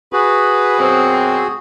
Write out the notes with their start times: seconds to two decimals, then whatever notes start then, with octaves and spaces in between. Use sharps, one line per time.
0.13 F#4 G#4 B4
0.79 F#2 B2 C4